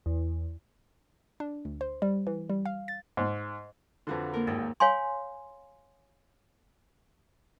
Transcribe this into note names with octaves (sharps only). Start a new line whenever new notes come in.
E2
D4
D2
C5
G3
E3
G3
F5
A6
G#2
F2 D3 F4 F#4 B4
A#3 A#4
G#1 D#2
C#5 F5 G#5 C6